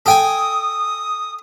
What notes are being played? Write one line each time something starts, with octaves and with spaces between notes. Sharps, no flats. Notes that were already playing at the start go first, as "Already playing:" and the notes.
A4 G5 G#5 D#6